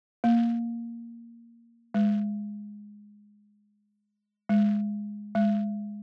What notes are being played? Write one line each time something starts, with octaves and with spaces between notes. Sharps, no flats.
A#3
G#3
G#3
G#3